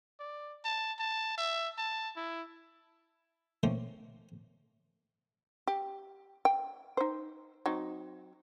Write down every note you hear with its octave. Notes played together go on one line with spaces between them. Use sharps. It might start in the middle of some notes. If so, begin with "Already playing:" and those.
D5
A5
A5
E5
A5
E4
D#3 F3 A3 A#3 C#4 C5
G4
G5
D#4 C5
F#3 C4 D#4